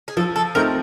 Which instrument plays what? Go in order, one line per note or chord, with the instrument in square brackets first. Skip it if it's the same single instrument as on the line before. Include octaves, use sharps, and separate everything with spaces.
[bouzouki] G#4
[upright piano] F3 [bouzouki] A4
[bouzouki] A4
[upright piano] A3 C4 D#4 [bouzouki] A#4